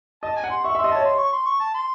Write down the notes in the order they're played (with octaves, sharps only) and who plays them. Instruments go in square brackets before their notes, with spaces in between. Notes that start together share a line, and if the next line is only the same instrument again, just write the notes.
[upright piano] D#5 [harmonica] A5
[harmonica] G#5
[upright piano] F#5
[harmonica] C6
[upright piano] E5 [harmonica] C#6
[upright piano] E5
[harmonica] C6
[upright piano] D#5
[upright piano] C#5 [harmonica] A5
[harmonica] C6
C#6
C6
C#6
A5
C6